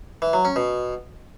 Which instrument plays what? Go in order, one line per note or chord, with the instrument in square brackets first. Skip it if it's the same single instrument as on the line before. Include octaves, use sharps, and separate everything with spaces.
[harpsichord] E3
F#3
C#4
B2